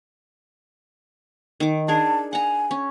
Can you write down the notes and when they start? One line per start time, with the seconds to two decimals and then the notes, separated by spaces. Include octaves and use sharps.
1.60 D#3 D6
1.88 D4 G#4 A#4 A5
2.33 F#5 G#5 A#5
2.71 C#4